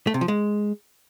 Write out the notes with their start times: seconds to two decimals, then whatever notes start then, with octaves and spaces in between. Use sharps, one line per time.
0.07 A3
0.14 C3
0.21 F3
0.28 G#3